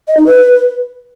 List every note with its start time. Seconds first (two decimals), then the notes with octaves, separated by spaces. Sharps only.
0.08 D#5
0.17 D#4
0.26 B4